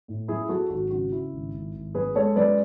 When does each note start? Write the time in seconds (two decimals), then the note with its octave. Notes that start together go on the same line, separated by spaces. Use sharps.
0.08 A2
0.28 F#2 E4 G#4
0.49 F#2 F#4 A4
0.70 G#1 F#4
0.91 C#3 F#4
1.11 C#3 E4
1.33 G#1
1.54 G#1
1.75 G#1
1.94 F#2 G#4 B4
2.15 G#3 A4 C#5
2.36 F#2 B4 D5